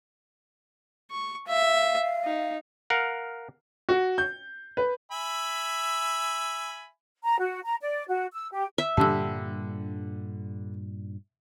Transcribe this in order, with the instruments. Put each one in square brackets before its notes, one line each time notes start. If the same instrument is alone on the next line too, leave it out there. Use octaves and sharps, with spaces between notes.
[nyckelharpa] C#6
[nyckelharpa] E5 [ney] F5
[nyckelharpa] D#4
[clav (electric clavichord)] A#4 F5 F#5
[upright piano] F#4
G6
B4
[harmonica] E5 G#5 B5
[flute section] A#5
F#4
A#5
D5
F#4
E6
G4
[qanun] E5
[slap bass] G2 A#2 D4 [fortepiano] D3 G3 [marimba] A5 E6